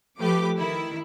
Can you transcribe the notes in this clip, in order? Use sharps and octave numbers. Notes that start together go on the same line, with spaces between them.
F3 A3 G4 B4 D6
D#3 E4